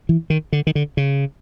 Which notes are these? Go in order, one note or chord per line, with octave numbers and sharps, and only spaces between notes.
E3
D#3
D3
D#3
D3
C#3